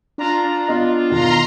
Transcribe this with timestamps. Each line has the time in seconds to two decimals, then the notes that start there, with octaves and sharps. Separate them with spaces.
0.18 D4 F4 A#5
0.68 B3 F4 D#5
1.10 E2 B2 D#3 A#5 C6